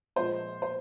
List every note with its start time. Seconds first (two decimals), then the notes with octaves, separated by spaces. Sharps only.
0.16 A#1 A#2 F3 G#3 C5
0.62 C5